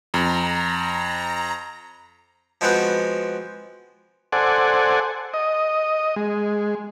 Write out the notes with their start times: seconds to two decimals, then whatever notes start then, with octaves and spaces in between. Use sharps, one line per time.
0.14 F2 A#5
2.61 F3 G#3 B3 C4 F#4 B4
4.32 A4 C5 D5 F#5 G#5
5.34 D#5
6.16 G#3